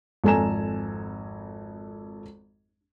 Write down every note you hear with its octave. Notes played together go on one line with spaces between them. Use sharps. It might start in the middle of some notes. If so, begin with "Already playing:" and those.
G#1 F2 A4 G#5 A#5 E7